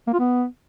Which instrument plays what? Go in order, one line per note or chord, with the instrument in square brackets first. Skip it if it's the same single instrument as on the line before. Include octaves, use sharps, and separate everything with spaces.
[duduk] A#3
F4
B3